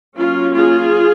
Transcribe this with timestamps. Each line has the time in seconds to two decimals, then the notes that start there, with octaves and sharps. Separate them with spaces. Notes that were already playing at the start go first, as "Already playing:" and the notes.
0.16 F#3 A#3 C#4 F4
0.56 F4 G#4